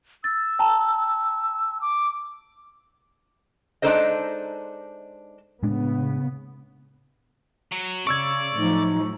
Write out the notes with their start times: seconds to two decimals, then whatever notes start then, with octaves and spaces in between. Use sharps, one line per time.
0.24 E6 A6
0.59 G5 A5 A#5
1.81 D6
3.82 G#3 D4 D#4 A4 C5 D#5
5.63 A2 C#3 G#3 B3 D4
7.72 F#3
8.07 C#3 D5 C#6 E6 G#6
8.58 A2 F3 F#3 D#4